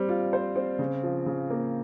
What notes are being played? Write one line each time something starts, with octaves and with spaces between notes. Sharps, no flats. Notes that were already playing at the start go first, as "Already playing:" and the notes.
Already playing: G3 C4
F4
C5
C4
C#3
F3
C#3
A#3